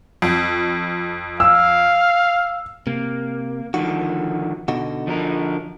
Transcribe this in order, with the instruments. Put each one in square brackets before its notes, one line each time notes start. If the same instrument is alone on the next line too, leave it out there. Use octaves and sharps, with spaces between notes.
[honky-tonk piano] F2
[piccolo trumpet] F5 [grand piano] E6
[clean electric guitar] C3 [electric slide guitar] A#3
[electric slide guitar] D3 D#3 F3 [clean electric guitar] F#4
[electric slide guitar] B2 [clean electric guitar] D3 D#4 F#4
[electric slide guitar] F3 D4 A#4